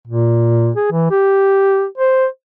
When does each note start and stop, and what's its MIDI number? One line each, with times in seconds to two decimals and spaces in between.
0.07 0.70 46
0.76 0.89 68
0.92 1.10 52
1.11 1.85 67
1.98 2.26 72